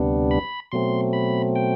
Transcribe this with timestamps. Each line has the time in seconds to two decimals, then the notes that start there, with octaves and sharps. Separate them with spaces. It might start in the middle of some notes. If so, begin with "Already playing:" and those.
Already playing: D2 C3 G3 B3 D4
0.31 B5
0.72 B2 F#3 A3 C4 C6
1.13 B5
1.56 G5